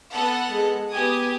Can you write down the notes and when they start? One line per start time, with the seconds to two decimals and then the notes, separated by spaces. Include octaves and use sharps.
0.13 B3 A4 F#5
0.49 G#3
0.93 B3 G4 G#5 D#6